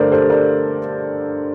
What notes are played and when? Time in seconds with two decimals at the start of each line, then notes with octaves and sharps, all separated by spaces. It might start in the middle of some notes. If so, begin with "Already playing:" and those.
Already playing: G2 D3 A3 A#4 C5 D5
0.12 A4 C5
0.30 A#4 D5